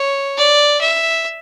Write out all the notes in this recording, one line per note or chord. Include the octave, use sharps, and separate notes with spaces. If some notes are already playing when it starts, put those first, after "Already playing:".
Already playing: C#5
D5
E5